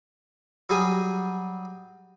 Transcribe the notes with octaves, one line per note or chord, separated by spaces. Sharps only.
F#3 G3 G#4 G#5 D#6